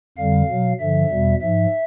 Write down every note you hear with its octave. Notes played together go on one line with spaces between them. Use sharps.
F2 D3 G3 F5
B2 F#3
G2 D3 F3 E5
E2 B2 G3
G#2 F3 E5